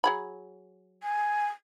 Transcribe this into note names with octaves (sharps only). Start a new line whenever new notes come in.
F#3 G#4 B5
G#5